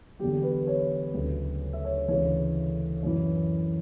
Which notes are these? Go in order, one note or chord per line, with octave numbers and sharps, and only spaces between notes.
E2 D3 F#3 G4
B4
C#5
D2 C#3 F#3
E5
C#5
D2 C#3 E3 C#5
F#2 E3